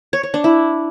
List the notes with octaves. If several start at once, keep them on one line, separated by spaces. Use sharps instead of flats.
C#5
C#5
D4
E4